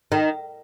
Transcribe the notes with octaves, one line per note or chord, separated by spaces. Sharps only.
D#3